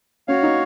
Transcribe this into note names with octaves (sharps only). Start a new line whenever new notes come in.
C#4 F#4 C#5 F5
D#4